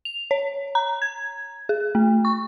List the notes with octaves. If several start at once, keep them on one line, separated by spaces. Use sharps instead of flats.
F7
C#5
A#5
G#6
G#4
A3
C#6